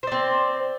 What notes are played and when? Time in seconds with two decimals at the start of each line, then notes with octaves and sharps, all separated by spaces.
0.03 C5
0.07 D5
0.12 C4